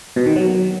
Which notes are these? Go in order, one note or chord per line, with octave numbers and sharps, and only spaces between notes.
B2
D#3
F#3